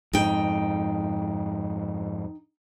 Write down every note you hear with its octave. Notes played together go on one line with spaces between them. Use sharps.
F2 G#2 D#4 G5